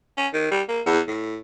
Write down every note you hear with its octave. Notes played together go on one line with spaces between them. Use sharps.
C#4
D#3
G3
A#3
E2
A2